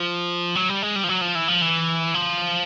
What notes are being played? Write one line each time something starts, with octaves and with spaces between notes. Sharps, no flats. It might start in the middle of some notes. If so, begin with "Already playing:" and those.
Already playing: F3
F#3
G3
G#3
G3
F3
F#3
F3
E3
F3
E3
F3